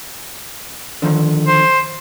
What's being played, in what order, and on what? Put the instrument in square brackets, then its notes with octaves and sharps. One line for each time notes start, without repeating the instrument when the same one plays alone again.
[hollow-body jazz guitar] D3 D#3 F3
[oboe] C5